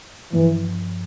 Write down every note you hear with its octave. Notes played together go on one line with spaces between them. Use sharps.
G2 E3 F3 A#3